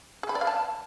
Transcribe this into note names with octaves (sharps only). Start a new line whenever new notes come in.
G#4
B5
D5
F5
A5